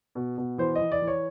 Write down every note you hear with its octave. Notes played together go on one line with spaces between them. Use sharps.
B2
B2
E3 C5
D#5
E3
D5
E3
C#5